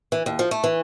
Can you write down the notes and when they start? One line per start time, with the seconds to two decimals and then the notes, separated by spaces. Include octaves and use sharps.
0.12 E3
0.26 D#2
0.39 F3
0.51 A3
0.64 E3